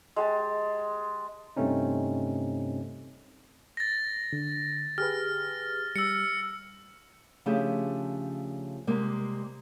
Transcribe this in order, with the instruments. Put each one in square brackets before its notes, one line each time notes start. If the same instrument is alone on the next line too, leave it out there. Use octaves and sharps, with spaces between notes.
[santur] G#3 G4 A5
[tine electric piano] G2 C3 A3 C4 C#4 D#4
[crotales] A6 A#6
[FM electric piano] D3
[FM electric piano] G4 G#4 B4 [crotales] F6
[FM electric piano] G3 [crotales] E6 C#7
[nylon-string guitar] C#3 F3 A3 D4 G4 G#4
C3 G3 G#3 A#3